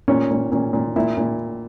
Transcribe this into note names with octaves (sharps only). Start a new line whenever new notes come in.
A#2 C#4
A#2
A#2 C#4
A#2
A#2 E4
A#2